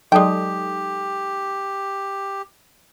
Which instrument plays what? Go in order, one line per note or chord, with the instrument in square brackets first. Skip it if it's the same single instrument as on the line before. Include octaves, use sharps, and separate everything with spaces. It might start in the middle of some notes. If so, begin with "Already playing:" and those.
[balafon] F#3 D5 [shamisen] G#3 G5 [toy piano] D#4 A4 D#6 [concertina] G4